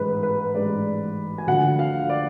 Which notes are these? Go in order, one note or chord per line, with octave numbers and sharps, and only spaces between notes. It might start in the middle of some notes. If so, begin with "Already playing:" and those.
Already playing: A1 G#2 G#3 B4
B4
A1 G#2 G#3 D5
G#5
D2 D3 F3 F#5
F5
D5